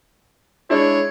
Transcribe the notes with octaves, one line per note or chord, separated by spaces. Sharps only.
G#3 D4 E4 C#5